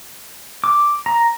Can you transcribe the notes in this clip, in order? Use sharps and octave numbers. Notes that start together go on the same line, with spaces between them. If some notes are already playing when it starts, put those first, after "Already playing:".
D6
A#5